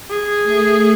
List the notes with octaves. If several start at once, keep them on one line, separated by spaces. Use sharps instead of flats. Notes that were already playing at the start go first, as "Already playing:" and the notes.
G#4
A3